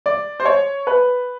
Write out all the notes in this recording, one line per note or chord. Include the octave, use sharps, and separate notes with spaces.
D5
C5
C#5
B4